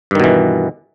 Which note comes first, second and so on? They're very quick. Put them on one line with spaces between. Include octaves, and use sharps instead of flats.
G2 D#3 B2 E3